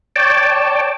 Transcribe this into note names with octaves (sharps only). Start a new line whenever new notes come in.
C#5 D5 G5 A5